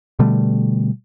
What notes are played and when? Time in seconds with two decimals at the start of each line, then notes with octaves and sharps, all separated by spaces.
0.19 B2 D3 G3 A3